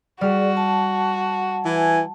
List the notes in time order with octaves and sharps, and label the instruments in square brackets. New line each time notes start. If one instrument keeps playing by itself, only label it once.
[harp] G3 F6 [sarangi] F#4 [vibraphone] G#4 D5
[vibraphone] A5
[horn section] E3 G#5